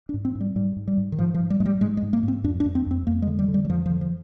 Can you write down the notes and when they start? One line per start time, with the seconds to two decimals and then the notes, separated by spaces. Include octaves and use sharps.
0.09 D4
0.14 G#2
0.25 C4
0.35 G#2
0.41 G3
0.56 G#2 G3
0.77 G#2
0.88 G3
0.97 G#2
1.12 D#3
1.19 G#2 F3
1.34 F3
1.39 G#2
1.50 G3
1.60 G#2 G#3
1.66 G3
1.81 G#2 G#3
1.97 G#3
2.03 G#2
2.13 A#3
2.23 G#2
2.28 C4
2.44 F2 D4
2.60 D4
2.66 F2
2.75 C4
2.86 F2 C4
3.07 F2 A#3
3.22 G#3
3.27 D3
3.39 G3
3.48 D3
3.54 G3
3.65 G3
3.69 F2 F3
3.86 F3
3.90 D3
4.01 F3